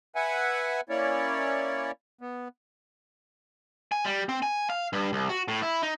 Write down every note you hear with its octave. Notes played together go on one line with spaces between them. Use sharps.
B4 E5 F#5 G#5
A#3 C#4 E4 C#5 D5
B3
G#5
G3
C4
G#5
F5
G2
C2
F#4
A2
E4
D#4